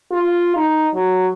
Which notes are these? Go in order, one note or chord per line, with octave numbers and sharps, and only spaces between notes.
F4
D#4
F#3